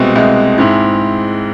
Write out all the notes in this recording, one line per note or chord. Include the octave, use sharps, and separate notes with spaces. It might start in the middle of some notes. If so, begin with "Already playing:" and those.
Already playing: C2 B2 G#3 C4
C2 B2 G#3 C4
G#2 G#3 C4 E4